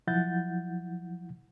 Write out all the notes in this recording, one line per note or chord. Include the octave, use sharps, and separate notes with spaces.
F3 F#3 E4 F#5 G6 A6